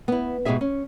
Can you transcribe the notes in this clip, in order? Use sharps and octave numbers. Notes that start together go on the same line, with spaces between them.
B3 E4
G#2 B2 E3 G4 G#4 E5
C#4